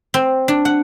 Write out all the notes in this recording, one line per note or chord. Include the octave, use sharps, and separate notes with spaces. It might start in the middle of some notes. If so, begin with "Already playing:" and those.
C4
D4
F#5